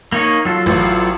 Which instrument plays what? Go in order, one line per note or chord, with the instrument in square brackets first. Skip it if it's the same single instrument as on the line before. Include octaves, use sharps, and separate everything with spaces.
[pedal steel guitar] A#3 D#4 C#5
F#3 F4 A4
[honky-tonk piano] A1